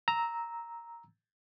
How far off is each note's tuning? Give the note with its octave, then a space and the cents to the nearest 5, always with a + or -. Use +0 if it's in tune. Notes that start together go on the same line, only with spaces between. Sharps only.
A#5 +0 E6 -15